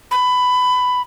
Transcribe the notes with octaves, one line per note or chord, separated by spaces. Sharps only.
B5